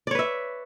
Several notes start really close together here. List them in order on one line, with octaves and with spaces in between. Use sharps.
D5 C#5 B4 E5